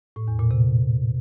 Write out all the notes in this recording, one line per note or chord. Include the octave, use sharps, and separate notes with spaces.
A2
E2
A#2
C3